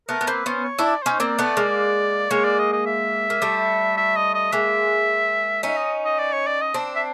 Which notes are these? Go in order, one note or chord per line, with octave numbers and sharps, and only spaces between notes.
A3 B3 A#4
B3
A#3 C4 B4
B3 C#4 C5
C#5
D4 E4 D5
C#4 D#4 C5
A#3 C4 D5
A3 B3
G#3 A#3
G#3 A#3 C#5
D5
D#5
D#5
E5
A#3
G3 A3
E5
D#5
D#5
G#3 A#3 E5
C#4 D#4 E5
D#5
D#5
D5
C#5
D5
D#5
C4 D4
E5